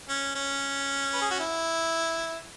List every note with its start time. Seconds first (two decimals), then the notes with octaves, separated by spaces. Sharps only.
0.09 C#4
0.35 C#4
1.14 B4
1.21 G#4
1.31 F#4
1.40 E4